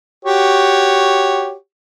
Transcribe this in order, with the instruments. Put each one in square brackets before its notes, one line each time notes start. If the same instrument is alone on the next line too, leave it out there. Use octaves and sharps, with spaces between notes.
[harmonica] F#4 G4 C#5